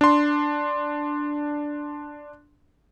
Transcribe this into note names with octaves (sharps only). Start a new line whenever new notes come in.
D4 C6